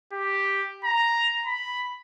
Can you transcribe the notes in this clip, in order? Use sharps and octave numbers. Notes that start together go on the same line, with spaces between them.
G4
A#5
B5